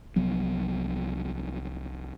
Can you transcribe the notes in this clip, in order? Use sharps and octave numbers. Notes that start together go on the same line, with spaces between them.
C2 F3 F#3 B3